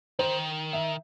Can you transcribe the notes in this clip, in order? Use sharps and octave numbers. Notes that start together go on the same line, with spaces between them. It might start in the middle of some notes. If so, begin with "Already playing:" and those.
D#3 C5
E5